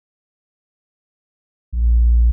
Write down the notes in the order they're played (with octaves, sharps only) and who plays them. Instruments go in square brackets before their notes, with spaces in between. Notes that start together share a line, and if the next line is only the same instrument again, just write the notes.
[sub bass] A#1